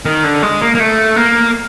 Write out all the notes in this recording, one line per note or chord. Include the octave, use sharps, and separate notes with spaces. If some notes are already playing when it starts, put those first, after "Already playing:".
D#3
D3
G#3
A#3
A#3
A3
A#3